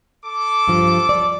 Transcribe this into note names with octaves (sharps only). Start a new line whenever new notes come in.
A4 D6
G2 F3
D5